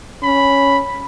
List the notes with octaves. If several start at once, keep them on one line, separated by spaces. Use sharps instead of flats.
C#4 B5